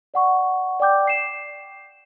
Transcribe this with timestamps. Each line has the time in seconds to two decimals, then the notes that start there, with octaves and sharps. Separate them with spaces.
0.14 D5 F#5 C#6
0.80 D5 G5 D6 G6
1.07 C7 E7